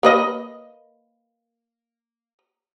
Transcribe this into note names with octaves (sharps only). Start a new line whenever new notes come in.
A#3 B4 D#5